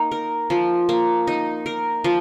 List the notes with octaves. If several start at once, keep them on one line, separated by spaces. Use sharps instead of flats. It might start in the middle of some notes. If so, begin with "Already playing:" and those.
Already playing: A#3 D#4
A#4
F3
A#3
D#4
A#4
F3